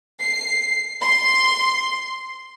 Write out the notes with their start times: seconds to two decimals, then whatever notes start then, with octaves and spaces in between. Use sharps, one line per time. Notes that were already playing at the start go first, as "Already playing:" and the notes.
0.21 C7
1.01 C6